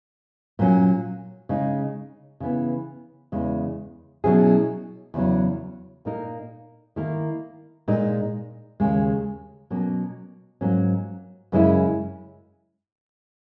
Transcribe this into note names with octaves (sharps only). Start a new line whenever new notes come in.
A#2 F#3 C#4
C#3 G#3 D#4
C#3 E3 B3
E2 C#3 G#3
B2 F#3 C#4 E4 G#4
E2 C#3 F#3
A#2 A#3 D#4 A#4
D#3 A#3 E4 A#4
A#2 G#3 D#4
D#2 C#3 G#3
B2 F#3 A#3 C#4
G#2 F#3 A#3 C#4
F#2 C#3 G#3 C#4 E4